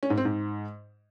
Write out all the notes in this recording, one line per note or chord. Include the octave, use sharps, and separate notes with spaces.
C#4
G#2
C4
G#2